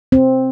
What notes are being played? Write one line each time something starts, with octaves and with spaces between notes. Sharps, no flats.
C4